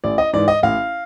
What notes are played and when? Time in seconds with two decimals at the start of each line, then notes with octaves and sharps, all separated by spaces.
0.04 A1 D5
0.18 D#5
0.33 G#2 E3 D5
0.48 D#5
0.63 A1 F5